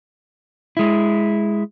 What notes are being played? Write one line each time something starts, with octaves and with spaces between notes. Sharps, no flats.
G#3 E4